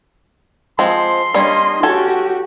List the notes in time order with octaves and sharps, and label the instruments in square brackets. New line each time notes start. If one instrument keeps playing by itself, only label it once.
[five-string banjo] F3 G#3 C4 [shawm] C6
[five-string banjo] G3 A#3 C#4 [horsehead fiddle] D4 D#5
[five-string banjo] C#4 A4 G#5 [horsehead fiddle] F#4 G4